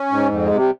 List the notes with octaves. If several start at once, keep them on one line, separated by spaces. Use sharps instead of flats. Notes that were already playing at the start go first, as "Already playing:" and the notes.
Already playing: C#4
G#2
F2
G#3
C3
G3